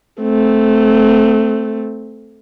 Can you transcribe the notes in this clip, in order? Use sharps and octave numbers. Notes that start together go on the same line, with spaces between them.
A3 C4